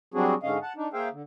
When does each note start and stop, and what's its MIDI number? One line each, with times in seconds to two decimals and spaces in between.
0.14 0.34 54
0.14 0.34 55
0.14 0.34 60
0.14 0.34 62
0.14 0.34 66
0.14 0.34 68
0.43 0.58 44
0.43 0.58 50
0.43 0.58 61
0.43 0.58 75
0.43 0.58 77
0.62 0.73 78
0.62 0.73 81
0.77 0.88 62
0.77 0.88 63
0.93 1.09 58
0.93 1.09 68
0.93 1.09 72
0.93 1.09 76
0.93 1.09 77
0.93 1.09 79
1.12 1.22 50